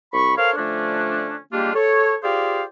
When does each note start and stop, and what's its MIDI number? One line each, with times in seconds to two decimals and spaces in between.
0.13 0.37 36
0.13 0.37 83
0.13 0.37 85
0.37 0.54 69
0.37 0.54 70
0.37 0.54 72
0.37 0.54 73
0.37 0.54 77
0.57 1.37 50
0.57 1.37 53
0.57 1.37 57
0.57 1.37 61
0.57 1.37 62
1.52 1.71 55
1.52 1.71 56
1.52 1.71 58
1.52 1.71 62
1.52 1.71 65
1.52 1.71 67
1.74 2.15 69
1.74 2.15 73
2.23 2.63 65
2.23 2.63 67
2.23 2.63 68
2.23 2.63 72
2.23 2.63 74
2.23 2.63 77